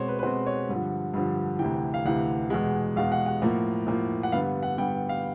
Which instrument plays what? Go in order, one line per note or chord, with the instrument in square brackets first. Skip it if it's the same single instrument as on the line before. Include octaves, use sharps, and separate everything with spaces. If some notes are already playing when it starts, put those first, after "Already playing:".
Already playing: [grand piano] B2 G#3 C4 C5 C#5
B4
B4
B2 G#3 C4 C5
C#5
G2 D3 F3
G2 D3 F3
D2 C3 E3 G5
F5
D2 C3 E3 F#5
E2 B2 G#3
E2 B2 G#3 F5
F#5
F#5
A2 F3 A#3
A2 F3 A#3
F#5
G2 D3 G3 B3 F5
F#5
G2 D3 G3 B3 G5
F5